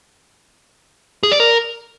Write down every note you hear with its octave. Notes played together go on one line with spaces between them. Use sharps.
G#4
D5
A#4